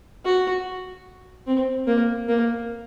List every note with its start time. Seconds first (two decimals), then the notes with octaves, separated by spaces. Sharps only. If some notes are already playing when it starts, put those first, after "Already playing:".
0.25 F#4
1.47 C4
1.87 A#3
2.28 A#3